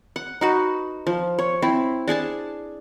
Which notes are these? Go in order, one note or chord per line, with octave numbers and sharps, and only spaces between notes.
F#5
D#4 F#4 B4
F3
C#5
C4 E4
D4 G#4 G#5 A5